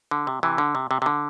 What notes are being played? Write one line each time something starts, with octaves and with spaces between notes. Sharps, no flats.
D3
C3
C3 E3
D3
C3
C3
C3
D3